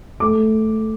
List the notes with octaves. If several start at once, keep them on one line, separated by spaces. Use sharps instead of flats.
A3 D6